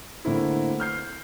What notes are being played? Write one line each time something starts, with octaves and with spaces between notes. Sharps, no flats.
D3 A3 A#3 C4 E4
F6 G6 C7